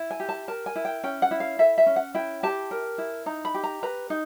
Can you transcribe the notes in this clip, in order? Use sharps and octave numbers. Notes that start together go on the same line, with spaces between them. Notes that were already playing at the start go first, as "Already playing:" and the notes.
Already playing: E4
G#5
G4
A5
A#4 A5
G#5
E4
G5
C#4 G5
F#5
E4
F5
A4 E5
E5
C#4
F#5
E4 G5
G4 A5
A#4
E4
D#4 A#5
B5
G4
A#5
B4 A#5
D#4